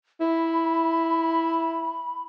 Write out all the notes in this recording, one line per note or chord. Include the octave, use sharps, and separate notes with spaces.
E4 B5